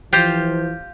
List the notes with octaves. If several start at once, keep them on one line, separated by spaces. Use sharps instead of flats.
E3 F3 F4 G4 C5